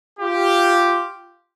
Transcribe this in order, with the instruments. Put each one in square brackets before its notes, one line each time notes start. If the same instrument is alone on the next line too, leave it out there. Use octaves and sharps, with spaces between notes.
[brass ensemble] F4 G4